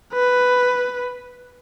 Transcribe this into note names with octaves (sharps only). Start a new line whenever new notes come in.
B4